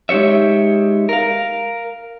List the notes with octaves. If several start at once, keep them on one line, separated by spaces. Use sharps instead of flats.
G#3 D#4 G4 C#5 E5
A#4 F5